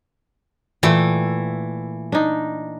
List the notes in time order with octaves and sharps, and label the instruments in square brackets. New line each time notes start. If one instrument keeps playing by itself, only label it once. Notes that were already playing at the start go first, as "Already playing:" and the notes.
[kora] A#2 A3 G5 [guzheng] E3
[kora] D4 D#4